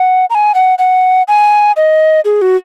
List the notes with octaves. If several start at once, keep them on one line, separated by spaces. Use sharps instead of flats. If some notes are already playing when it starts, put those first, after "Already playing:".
Already playing: F#5
A#5
G#5
F#5
F#5
G#5
D#5
G#4
F#4